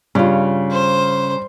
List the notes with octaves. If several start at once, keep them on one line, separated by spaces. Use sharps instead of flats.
G2 C#3 F4
C5